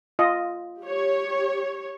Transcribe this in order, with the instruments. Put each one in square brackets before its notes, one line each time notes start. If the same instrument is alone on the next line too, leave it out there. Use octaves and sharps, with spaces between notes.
[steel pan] F4 D#5
[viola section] G4 C#5